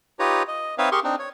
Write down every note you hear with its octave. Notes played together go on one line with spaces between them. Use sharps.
D#4 F4 G4 B4 C#5 A#5
D#5
C4 D#4 B4 C#5 E5 F5
G4 G#4 A#4 C6 C#6
C4 D4 D#4
C#5